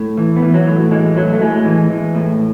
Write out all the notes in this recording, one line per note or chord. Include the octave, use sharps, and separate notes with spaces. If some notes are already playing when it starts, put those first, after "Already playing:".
Already playing: A2
E3
B3
E3
F#3
A2
E3 G#3
A2 F#3
A3
A2 G#3
E3
E3
A2